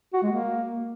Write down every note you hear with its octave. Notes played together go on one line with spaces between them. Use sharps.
F#4
G#3
A#3